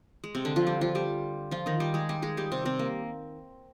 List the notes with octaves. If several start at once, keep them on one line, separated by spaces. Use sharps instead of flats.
G#3
C3 C4
D3 D4
F3 F4
G3 G4
F3 F4
G3 G4
F3 F4
D#3 D#4
G3 G4
G#3 G#4
G3 G4
G#3 G#4
G3 G4
C3 C4
C3 C4
A#3